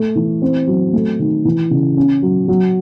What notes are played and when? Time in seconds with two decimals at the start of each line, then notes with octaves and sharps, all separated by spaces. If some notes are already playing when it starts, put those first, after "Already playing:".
Already playing: A3
0.15 E3
0.42 C4
0.67 F#3
0.93 A3
1.19 D#3
1.45 E3
1.70 C#3
1.97 C#4
2.22 F#3
2.48 F#3